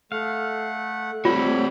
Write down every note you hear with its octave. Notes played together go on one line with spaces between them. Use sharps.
A3 F5 F#5
G3 A3 C4 F4 C#5 B5